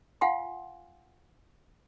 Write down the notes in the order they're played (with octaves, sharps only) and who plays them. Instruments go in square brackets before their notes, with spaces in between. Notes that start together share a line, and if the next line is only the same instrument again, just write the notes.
[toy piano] F4 F5 F#5 G#5 C6